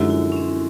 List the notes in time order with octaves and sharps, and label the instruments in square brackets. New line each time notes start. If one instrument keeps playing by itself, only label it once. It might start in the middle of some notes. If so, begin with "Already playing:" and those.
Already playing: [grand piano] F#2 D3 F3 G#3 [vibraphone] E4 F#4
[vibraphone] E4
C#4
C4